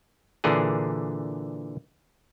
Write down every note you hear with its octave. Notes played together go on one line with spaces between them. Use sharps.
A#2 D3 E3 D4 G#4